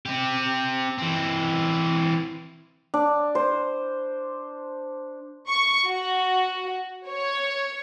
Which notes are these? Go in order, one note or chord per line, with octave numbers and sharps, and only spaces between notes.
C4 G4
E3 C4
D4
C5
C#6
F#4
C#5